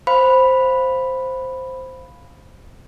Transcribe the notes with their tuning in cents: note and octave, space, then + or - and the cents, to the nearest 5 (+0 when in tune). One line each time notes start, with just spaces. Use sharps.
C5 +0 F5 +0 B5 +0